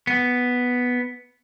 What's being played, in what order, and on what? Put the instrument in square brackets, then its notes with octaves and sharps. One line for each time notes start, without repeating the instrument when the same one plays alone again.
[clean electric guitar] B3